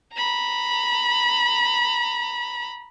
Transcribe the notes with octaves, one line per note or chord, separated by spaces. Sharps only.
A#5 B5